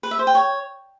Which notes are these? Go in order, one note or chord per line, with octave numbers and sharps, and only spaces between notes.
B4
E5
C5
G5
C#5